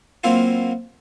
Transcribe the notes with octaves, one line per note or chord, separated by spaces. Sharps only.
F#3 A#3 C4 E4 F4